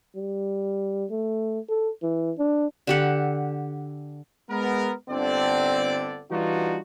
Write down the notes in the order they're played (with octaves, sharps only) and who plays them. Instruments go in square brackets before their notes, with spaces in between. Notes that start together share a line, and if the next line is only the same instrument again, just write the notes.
[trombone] G3
A3
A4
E3
D4
[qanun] D3 G4 F#5
[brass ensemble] G#3 B3 A#4
G1 D3 C4 D5
E3 G3 D4 D#4 F4 F#4